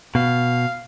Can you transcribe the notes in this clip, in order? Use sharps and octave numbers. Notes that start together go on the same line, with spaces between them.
B2 F5